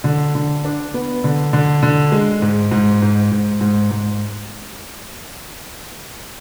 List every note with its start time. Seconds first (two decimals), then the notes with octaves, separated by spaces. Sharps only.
0.04 D3
0.35 D3
0.65 D4
0.94 B3
1.24 D3
1.53 D3
1.83 D3
2.12 G#3
2.42 G#2
2.71 G#2
3.02 G#2
3.31 G#2
3.61 G#2
3.91 G#2